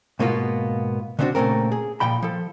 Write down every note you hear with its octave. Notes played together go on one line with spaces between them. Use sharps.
G#2 B2 A#3 B3 F4
D3 B3 C4 D4 F#4
A#2 C#3 A3 C4 A#4
G#4
A#2 F3 G5 B5
F3 A4